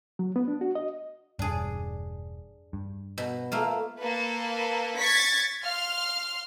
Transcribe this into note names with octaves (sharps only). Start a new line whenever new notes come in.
F#3
B3
D4
F#4
D#5
E1 G2 D4 G#4
G2
B2
A3 A#3 F4
A#3 A4 B4
C#6 G#6 A6 B6 C#7
F5 C6 F6